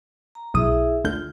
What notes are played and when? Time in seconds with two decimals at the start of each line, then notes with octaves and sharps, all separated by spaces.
0.35 A#5
0.54 B1 E4 G#4 E5 D#6
1.04 D2 D3 F4 G6